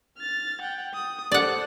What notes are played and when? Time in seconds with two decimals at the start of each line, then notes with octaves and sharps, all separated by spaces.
0.18 F6 A6
0.61 F#5 G5
0.94 D#6
1.32 A4 C5 D5 F#5